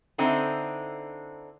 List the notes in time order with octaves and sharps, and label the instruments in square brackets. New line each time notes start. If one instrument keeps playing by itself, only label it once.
[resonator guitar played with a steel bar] D3 C4 D#4 E4